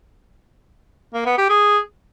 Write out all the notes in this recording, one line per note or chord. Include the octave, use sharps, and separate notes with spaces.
A#3
B3
G4
G#4